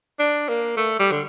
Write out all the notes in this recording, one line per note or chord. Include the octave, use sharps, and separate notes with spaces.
D4
A#3
A3
G3
D3